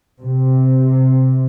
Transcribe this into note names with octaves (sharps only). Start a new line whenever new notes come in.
C3